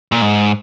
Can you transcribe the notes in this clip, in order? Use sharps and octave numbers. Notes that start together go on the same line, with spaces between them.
A#2
G#2